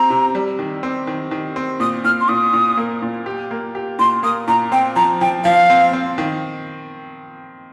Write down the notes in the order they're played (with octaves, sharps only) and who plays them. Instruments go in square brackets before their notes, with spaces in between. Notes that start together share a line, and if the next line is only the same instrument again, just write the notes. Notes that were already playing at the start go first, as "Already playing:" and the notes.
Already playing: [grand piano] C4 G4 [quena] A#5
[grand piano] C3
G3
D#3
C4
D#3
D#3
C4
[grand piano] A#2 [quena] D#6
[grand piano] A#2 [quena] F6
[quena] C6
[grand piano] A#2 [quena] D#6
[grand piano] A#2
A#3
A#2
G4
A#3
G4
[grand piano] A#2 [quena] C6
[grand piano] A#3 [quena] D#6
[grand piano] A#2 [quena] A#5
[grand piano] C4 [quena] G5
[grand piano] F3 [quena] A#5
[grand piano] F3 [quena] G5
[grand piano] F3 [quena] F5
[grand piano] C4
C4
D#3